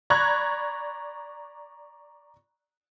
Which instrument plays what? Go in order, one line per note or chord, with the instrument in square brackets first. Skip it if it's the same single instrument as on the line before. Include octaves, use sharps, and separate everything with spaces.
[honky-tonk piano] D5 A#5 B5 C#6 F#6 G#6